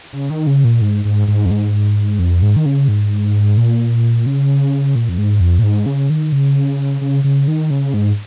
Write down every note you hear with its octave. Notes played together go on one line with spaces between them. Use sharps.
C#3
D#3
C#3
A#2
G#2
G#2
G#2
F2
G#2
F2
G#2
D#3
C#3
G#2
A#2
C#3
A#2
F2
G#2
F2
A#2
G#2
C#3
D#3
C#3
C#3
C#3
D#3
C#3
G#2